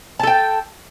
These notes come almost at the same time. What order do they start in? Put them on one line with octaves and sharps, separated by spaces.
A5 A4 G5